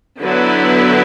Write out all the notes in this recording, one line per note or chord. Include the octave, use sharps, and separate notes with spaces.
D3 F#3 B3 E4 B4